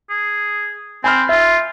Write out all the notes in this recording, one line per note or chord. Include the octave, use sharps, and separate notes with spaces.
G#4
C4 G#5 B5 F6
F4 E5